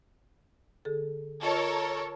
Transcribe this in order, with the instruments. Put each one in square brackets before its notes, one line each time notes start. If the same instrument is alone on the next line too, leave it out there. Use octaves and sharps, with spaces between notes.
[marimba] D3 G#4 A4
[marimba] F4 D#5 [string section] A4 A#4 C#5